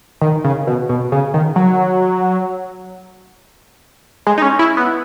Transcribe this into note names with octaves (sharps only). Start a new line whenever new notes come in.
D#3
C#3
B2
B2
C#3
D#3
F#3
G#3
D#4
C#4
E4
B3